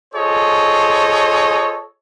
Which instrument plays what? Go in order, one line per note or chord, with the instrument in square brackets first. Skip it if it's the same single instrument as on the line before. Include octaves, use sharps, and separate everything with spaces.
[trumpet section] F4 G#4 A4 C5 C#5 D#5